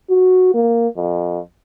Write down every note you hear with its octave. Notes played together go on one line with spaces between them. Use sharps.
F#4
A#3
F2